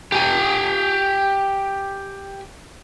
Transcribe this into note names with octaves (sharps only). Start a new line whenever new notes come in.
G4 G#5